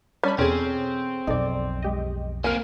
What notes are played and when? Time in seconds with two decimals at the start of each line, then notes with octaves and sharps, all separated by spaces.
0.24 G3 C#4 C#5 A5 B5
0.38 E2 B2 C4 C#4 G#4 A4
1.27 B1 F2 D#4 A4 D5
1.82 G#3 G4 D#5
2.44 A#3 C4 A#4 G#5